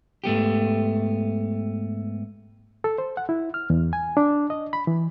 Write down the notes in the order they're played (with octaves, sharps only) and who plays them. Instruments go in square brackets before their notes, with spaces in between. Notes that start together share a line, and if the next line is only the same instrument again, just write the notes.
[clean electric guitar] G#2 A3 B3 G4
[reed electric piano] A4
C5
F#5
E4
F6
E2
G#5
D4
D#5
B5
E3